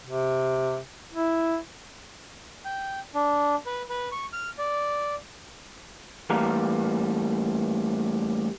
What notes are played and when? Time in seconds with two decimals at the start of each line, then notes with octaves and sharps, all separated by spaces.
0.07 C3
1.13 E4
2.65 G5
3.15 D4
3.66 B4
3.89 B4
4.12 C#6
4.33 F6
4.58 D5
6.30 A2 E3 G3 A#3 F5 A#5